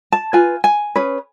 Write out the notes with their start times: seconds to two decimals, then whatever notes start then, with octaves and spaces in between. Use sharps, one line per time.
0.12 A5
0.33 F4 B4 G#5
0.64 G#5
0.96 C#4 G#4 B4